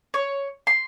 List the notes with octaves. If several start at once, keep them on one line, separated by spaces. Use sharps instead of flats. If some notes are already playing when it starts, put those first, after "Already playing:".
C#5
C6